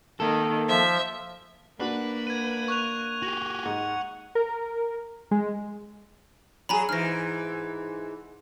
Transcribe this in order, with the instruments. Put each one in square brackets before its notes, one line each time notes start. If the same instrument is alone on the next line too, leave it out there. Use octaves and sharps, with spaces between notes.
[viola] D#3 [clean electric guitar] A#3 A4
[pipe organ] F3 [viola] E5
[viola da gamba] A#3 [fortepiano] D4 F#4 [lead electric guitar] B4
[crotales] G#6 D#7
C#6 F#6 F7
[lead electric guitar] F#4 G4
[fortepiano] G#2 [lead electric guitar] F#5
[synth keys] A#4
G#3
[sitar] F#3 G#4 [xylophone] G#5 A#5 B5
[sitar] G#2 E3 [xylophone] F6 A#6